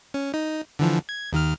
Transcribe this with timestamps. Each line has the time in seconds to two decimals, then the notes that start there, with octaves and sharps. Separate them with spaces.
0.14 C#4
0.34 D#4
0.79 D3 E3 F3
1.09 G#6
1.33 D#2 D#3 F6